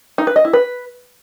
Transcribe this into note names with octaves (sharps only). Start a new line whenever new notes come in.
D#4
B4
D#5
E4
B4